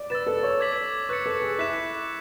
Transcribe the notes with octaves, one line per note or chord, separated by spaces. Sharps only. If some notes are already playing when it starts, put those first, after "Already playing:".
Already playing: D5
B4 E6 A6 E7
A4
C#5
D6 G#6 B6 F#7
B4 C#6 F#6 A6 C#7
A4
G#4
E4 F#6 B6 E7